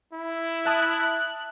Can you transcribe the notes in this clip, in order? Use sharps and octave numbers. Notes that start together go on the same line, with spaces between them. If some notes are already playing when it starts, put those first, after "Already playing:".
E4
E5 A5 D#6 F#6